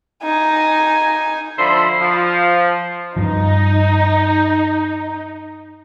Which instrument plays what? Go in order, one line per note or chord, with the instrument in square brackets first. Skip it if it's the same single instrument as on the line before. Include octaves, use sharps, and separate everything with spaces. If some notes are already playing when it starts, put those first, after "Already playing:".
[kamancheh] D#4 G#5
[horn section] D3 F3 C5 E5 B5
F3
[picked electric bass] G2 F3 [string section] D#4